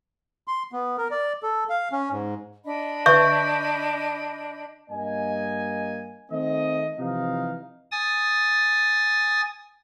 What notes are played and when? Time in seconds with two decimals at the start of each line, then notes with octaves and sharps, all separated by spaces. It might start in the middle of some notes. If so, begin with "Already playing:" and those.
0.48 C6
0.72 B3
0.98 A#4
1.11 D5
1.43 A4
1.69 F5
1.92 C#4
2.11 G#2
2.65 D4 D#5 B5
3.06 D3 B4 E5 C#6 G6
4.91 G2 A#3 D#5 G#5
6.31 D#3 A3 C4 D#5
6.99 C3 E3 F3 D#4 D#5 F5
7.92 G#5 D#6 A6